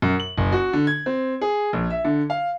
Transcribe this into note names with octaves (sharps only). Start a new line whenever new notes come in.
F#2
F#7
F#1
F#4
D3
G#6
C4
G#4
A#1
E5
D3
F5